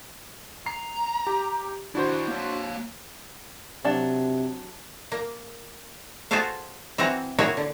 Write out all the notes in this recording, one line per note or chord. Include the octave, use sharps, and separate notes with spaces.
A#5 C7
G4
D#3 D4 E4 F#4 C5
A#3 C#5
C3 F#3 D4 A5
A#3
F4 F#4 G#4 A4 C5 F5
E3 C4 E4 F#4 A#5
A#3 E4 F#4 G#4 C#5 E5
D3